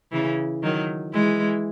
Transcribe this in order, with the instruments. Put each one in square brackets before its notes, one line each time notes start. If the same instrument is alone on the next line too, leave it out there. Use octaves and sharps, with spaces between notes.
[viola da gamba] C#3 E3
D#3 F#3
E3 G#3